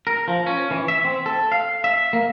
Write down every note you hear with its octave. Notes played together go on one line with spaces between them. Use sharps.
A#4
F3
C#4
E3
E5
C4
A4
F5
E5
A#3